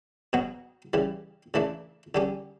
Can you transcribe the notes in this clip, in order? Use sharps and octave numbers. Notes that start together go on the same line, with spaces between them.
B2 F#3 B3 F#4
C#3 E3 G3
C#3 E3 A3 D4
D3 G3 C#4 G4